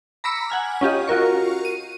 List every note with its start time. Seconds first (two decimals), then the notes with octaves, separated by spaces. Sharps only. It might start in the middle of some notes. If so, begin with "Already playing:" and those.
0.24 A#5 B5 D6 E6 B6 C#7
0.50 F#5 G#5 F6
0.81 C#4 F4 G4 D#5
1.08 F4 F#4 A#4 C#6
1.65 D#7